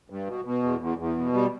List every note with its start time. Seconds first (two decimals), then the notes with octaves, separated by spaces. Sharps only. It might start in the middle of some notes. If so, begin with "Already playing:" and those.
0.10 G2
0.27 B2
0.45 B2
0.63 E2
0.81 E2
0.98 E2
1.16 B2
1.33 G3